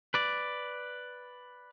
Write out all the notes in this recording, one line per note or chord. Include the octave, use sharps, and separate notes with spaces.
B4 D5